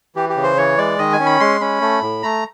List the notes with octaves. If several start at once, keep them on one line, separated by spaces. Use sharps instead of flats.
E3 G4
G4
C#3
C5
E3 C#5
G#3 D5
D#3 D#5
G#5
C#4
B5
G#3 C6
C#4 B5
A3
A2
A3 A#5